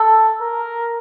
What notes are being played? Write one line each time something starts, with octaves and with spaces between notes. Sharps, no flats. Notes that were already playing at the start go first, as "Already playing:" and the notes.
Already playing: A4
A#4